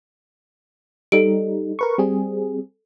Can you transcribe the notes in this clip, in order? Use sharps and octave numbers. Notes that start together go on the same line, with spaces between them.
G3 D#4 A4 D7
A#4 B4 C#6
G3 C4 G#4